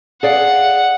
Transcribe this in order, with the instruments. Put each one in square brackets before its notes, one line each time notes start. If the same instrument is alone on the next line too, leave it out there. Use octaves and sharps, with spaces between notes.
[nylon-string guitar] G#4 D5 F5 [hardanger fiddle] F#5